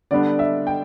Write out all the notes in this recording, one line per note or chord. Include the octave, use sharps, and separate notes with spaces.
D3 G3 B3 D4 D5
E5
G5